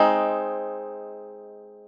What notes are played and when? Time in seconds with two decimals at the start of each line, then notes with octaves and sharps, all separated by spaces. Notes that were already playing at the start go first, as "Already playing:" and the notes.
Already playing: G#3 C4 D#4